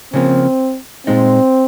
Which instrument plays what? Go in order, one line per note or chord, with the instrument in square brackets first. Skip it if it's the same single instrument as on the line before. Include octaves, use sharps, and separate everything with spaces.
[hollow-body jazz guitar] C#3 F3 A#3 [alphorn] C4
[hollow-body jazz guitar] A#2 G#3 D#4 [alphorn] C4